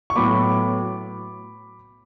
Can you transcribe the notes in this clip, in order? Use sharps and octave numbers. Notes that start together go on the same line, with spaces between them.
C#6
A2 F#3 B3 B5 D6